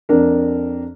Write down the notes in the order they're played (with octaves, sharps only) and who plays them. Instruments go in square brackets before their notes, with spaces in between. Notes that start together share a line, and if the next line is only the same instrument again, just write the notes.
[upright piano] F2 D4 A#4